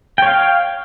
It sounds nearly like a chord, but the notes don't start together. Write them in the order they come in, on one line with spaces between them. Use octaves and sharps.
G5 C#5 F5